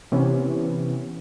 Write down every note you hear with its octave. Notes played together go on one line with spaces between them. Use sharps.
C3 E3 B3 C#4